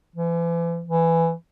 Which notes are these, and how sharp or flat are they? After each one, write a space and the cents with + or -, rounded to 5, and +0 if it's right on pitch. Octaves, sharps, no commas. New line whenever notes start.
E3 +40
E3 +10